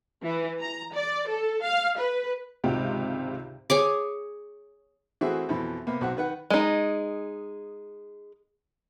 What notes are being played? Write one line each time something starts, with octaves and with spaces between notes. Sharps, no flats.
E3
A#5
D5
A4
F5
B4
G#1 C#2 C3 F4 G4
G#4 C#5 D6
E3 A3 C4 F#4 G#4 E5
F2 B2 E3
C3 A#3 B3
B1 C4 F#4 F#5
D#3 B4 F#5
G#3 D#4